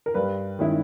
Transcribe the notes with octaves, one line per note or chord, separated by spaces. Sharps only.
A#4
G2 B4
D#3 G#3 C#4 E4